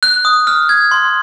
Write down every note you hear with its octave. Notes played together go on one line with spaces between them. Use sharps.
F#6
D#6
F6
G#6
C6